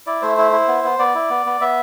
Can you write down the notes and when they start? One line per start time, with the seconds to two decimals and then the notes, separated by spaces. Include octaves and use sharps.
0.07 E4 D5
0.22 A3 C5
0.38 E4
0.52 E4
0.68 B3
0.84 B3
0.99 B3 D5
1.15 E4
1.30 B3
1.46 B3
1.61 B3 E5